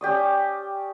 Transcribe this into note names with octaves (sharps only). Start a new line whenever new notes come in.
C#4 G4 D5 D#6